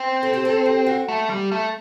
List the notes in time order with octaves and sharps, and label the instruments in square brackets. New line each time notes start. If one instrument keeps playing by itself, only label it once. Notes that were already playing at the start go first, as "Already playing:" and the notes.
Already playing: [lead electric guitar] C4
[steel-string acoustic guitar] A4
G4
A4
G4
F#4
[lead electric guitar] A3
G3
A3